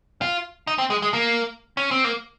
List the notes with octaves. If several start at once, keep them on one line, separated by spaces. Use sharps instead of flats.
F4
D#4
C4
G#3
G#3
A#3
C#4
C4
A#3